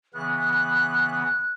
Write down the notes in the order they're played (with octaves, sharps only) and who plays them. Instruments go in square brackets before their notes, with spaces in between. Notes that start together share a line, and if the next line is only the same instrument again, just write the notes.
[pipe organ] C#3 E3 B3 [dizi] F#6